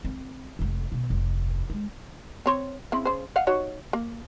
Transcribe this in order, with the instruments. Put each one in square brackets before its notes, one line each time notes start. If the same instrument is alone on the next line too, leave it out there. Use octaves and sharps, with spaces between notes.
[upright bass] C4
F1 A3
B2
F1 D2
G#3
[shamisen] C4 C#5
C#3 C4 E4
C#3 C5
D#5 F5 F#5
D#4 F#4 C#5
A#3